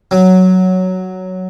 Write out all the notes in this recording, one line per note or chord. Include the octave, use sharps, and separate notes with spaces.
F#3